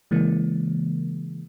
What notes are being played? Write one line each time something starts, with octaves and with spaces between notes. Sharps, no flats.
C#3 E3 G#3 A#3